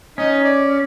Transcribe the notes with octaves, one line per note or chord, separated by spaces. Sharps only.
C#4 D#4 D#5
D5